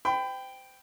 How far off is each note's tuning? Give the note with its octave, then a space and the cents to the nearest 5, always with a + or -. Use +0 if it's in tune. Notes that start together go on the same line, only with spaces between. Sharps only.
C5 -30 G5 +0 B5 +30